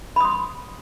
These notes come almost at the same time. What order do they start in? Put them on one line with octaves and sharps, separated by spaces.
B5 D#6 C6